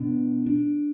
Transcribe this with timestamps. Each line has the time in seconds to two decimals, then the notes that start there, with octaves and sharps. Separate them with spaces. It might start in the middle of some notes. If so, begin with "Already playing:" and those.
Already playing: B2 B3 D4
0.46 D4